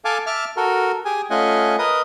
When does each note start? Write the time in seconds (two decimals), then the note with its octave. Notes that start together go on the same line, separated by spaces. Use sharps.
0.05 A4 F5 G#5 A5 D6
0.26 E5 A5 D6 F6
0.57 F#4 A4 A#4
1.05 G4 G#4 G#5
1.30 A3 C#4 F4 D#5 F#5 G#5
1.78 A#4 B4 D#5 D#6